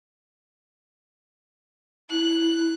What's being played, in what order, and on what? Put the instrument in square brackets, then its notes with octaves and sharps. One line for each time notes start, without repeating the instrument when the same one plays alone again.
[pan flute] E4 [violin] F#6